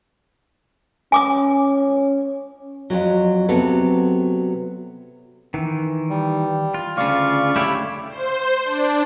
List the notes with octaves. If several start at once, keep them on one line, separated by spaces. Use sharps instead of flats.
C#4 G#5 D6 D#6
F2 G#2 F#3
C3 F#3 B3 C4 A4
D#3 E3
G3
F4
D2 C#3 D5 F5 C#6
A3 E4 G4 C#5
C5
D4